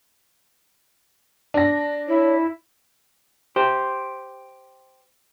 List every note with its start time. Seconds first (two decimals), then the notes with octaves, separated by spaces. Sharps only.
1.54 D4 A#6
2.08 E4 C#5
3.56 G4 C5